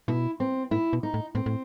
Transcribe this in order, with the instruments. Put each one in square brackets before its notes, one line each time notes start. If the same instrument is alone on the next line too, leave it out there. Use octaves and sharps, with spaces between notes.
[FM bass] B2 [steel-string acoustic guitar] E4
[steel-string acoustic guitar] C4
[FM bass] A2 [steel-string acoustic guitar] E4
[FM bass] B2
[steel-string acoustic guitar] D#4
[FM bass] A2
[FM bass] A2 [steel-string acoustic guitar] C4
[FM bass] A2